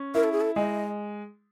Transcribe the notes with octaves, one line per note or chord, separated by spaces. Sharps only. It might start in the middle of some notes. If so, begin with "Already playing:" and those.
Already playing: C#4
E4 A#4
A4
G#4
A4
G#3 D#5